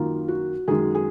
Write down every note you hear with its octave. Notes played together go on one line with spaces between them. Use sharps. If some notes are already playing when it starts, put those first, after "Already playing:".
Already playing: F#2 D#3 A#3 F4
F#4
F#2 D#3 G#3 G#4
G#4